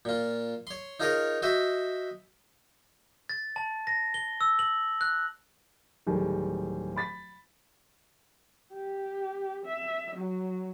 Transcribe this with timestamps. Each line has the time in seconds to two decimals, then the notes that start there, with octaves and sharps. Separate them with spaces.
0.05 A#2 F4
0.67 C#5 C6
1.00 D#4 F4 G#4 A#4 C#5 D#5
1.42 F#4 C5 D#5 E5
3.29 A6
3.56 A5
3.87 A#6
4.14 G7
4.41 E6
4.59 F#7
5.01 F#6
6.06 D1 D#3 G3 G#4 A4
6.96 B5 A6 B6
8.73 G4
9.65 E5
10.16 F#3